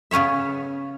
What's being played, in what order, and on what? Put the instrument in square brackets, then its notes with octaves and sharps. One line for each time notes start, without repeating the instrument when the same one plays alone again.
[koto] C#3 B3 C#4 C#5 E5